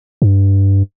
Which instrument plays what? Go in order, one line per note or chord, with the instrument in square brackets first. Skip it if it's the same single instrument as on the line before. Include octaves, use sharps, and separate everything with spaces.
[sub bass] G2